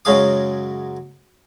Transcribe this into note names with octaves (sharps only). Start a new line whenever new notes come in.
F#2 C#3 F#3 G#3 F5 D#6